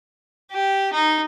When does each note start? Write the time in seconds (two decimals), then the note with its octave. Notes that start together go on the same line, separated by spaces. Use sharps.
0.52 G4
0.93 D#4